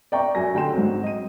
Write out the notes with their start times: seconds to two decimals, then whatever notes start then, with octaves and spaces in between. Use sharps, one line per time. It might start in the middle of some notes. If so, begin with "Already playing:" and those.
0.12 D5 E5 G5 A#5 C#6
0.35 F#2 G#5 A#6
0.54 D2 D3 G5 C6 E7
0.74 G#2 F#3 C4
1.03 D#5 D#7